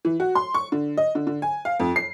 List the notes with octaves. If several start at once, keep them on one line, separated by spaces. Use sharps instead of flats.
E3
F#4
C6
C#6
D3
D#5
D3
D3
G#5
F5
F2
C7